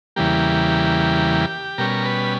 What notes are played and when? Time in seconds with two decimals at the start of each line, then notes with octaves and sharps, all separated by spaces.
0.16 E2 C#3 E3 G3 A#3 G4
1.78 B2 G3 C#4 A#4
2.05 B4